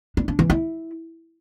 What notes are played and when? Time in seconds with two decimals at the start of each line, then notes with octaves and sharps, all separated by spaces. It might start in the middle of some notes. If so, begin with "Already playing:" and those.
0.17 D4
0.28 D4
0.39 E3
0.50 E4